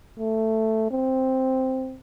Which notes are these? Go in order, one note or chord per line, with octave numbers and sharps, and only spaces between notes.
A3
C4